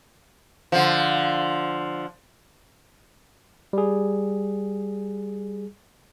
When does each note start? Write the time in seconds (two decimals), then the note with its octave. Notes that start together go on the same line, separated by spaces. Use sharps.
0.72 D3 F3
3.73 G3 G#4